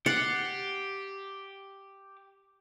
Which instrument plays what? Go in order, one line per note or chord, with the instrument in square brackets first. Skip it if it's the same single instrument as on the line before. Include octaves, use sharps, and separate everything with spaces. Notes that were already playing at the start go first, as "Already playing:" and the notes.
[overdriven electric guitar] G4 [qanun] F#5 [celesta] A6 C7